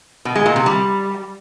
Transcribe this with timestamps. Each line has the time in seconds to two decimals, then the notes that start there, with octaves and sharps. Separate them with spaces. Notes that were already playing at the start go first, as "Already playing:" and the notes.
0.25 B2
0.36 G#3
0.46 A#2
0.56 C3
0.66 G3